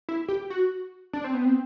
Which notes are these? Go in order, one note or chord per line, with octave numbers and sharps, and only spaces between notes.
E4
G4
F#4
D4
C4
B3
C4